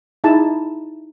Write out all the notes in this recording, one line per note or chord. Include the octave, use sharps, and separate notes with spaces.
D#4 E4 G#4 A5